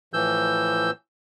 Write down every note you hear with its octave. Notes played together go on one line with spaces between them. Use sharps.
A2 E3 F3 E6 G6